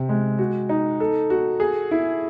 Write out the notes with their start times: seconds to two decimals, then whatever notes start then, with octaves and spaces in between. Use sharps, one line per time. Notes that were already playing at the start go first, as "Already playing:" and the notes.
Already playing: C3
0.09 G#3
0.39 F#4
0.69 D#4
1.00 A4
1.30 F#4
1.60 G#4
1.91 E4